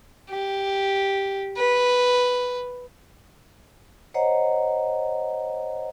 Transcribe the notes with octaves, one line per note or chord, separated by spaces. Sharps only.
G4
B4
C5 C#5 D#5 F#5 A#5